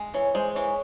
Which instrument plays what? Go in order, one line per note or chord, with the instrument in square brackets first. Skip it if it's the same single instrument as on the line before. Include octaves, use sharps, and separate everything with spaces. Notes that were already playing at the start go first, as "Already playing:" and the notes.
Already playing: [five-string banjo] G#3
[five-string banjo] E3 [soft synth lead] C#5
[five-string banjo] G#3 [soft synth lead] C5
[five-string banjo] E3 [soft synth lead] C#5